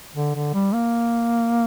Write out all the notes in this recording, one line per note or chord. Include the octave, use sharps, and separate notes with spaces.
D3
D3
G3
A#3